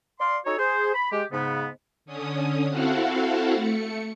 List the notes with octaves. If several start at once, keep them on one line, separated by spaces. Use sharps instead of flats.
D5 F5 C6
C#4 D#4 F#4 A4 C#5
G#4 C5
B5
G#3 G4
G#2 C#3 B3
D3 C#4 D#6
C4 E4 F#4 A4 F5 F#5
A3 C#7